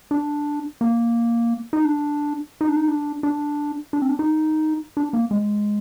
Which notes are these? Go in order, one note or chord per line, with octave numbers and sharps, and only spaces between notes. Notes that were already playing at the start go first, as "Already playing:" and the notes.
D4
A#3
D#4
D4
D#4
D4
D#4
D4
D4
D4
C4
D4
D#4
D4
A#3
G#3